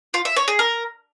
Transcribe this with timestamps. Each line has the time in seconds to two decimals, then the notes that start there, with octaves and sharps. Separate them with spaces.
0.14 F4
0.25 E5
0.36 C#5
0.48 G#4
0.59 A#4